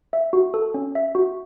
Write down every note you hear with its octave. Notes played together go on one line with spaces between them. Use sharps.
E5
F#4
A4
C#4
E5
F#4